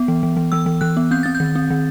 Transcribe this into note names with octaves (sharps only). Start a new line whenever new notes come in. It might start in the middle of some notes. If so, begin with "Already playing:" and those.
Already playing: B3
E3
E3
E3
E3 E6
E3
E3 F#6
B3
C4 G6
C4 A6
G6
D#3
C4
D#3